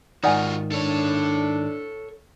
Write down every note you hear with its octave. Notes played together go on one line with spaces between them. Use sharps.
G#2 D#3 F4 F#4 D5 F#5 G#5
D4 A4 C#5